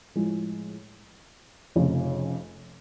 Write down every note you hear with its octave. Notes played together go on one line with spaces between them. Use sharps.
A2 F3 G#3
F1 F2 C#3